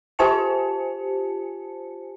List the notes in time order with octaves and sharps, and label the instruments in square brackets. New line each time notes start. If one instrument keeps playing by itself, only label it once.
[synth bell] F4 G4 C5 G#5 A5 C#7